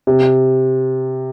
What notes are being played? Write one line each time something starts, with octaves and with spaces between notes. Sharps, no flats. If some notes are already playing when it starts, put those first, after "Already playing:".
C3